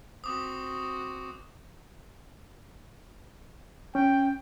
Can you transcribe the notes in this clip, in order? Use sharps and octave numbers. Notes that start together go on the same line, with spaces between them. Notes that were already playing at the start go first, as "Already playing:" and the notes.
C4 F#4 D6 D#6
C#4 G5